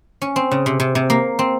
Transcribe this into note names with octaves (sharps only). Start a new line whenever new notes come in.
C#4
C4
C#3
C3
C3
C3
A#3
C4